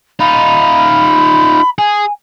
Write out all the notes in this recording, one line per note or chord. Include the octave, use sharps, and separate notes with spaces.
D#4 F4 B5
G#4 G#5